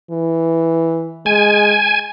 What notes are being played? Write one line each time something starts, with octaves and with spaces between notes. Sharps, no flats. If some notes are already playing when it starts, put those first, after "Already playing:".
E3
G#3 G#5